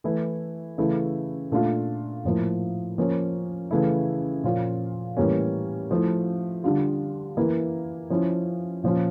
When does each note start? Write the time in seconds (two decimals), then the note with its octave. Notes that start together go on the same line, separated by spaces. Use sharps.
0.04 E3 A3 E4
0.78 C#3 E3 A3 E4
1.52 A#2 A3 D4 F4
2.25 A2 F3 A#3 E4
2.98 F3 A#3 C#4
3.71 C#3 E3 A3 E4
4.44 A#2 F3 A#3 C#4 F4
5.17 A2 E3 G3 A#3 C#4
5.91 F3 A3 E4
6.64 D3 G3 D4 F4
7.37 E3 A#3 E4
8.10 F3 C#4 E4
8.83 A#2 F3 C#4 F4